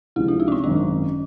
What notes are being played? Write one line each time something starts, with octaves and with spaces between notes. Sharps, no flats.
C#2 C3 F3 E4
D4
D#4
C#4
C4
G#1 F#2 D#3 C#4